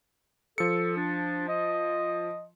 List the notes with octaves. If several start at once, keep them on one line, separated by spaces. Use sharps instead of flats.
F3 A4 C#7
D4
D#5